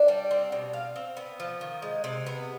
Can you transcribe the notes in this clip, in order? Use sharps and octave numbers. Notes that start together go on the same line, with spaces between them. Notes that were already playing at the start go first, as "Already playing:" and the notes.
Already playing: D4
G3
C4
B2
F5
C4
B3
F3
D#3
G#3
C3
B3